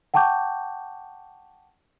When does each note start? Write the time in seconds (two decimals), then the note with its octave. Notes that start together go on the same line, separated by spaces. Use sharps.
0.14 F#5 G5 A5 C#6 D6 G6